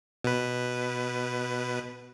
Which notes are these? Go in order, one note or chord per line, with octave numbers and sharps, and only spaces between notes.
B2 B4